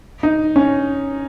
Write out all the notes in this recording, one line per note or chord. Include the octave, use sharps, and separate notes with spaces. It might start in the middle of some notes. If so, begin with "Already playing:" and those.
D#4
C#4